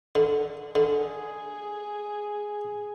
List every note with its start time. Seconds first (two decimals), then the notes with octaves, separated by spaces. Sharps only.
0.15 D3
0.75 D3 G#4